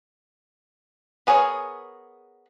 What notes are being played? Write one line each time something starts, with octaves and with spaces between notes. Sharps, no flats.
B3 G#4 A#4 C#5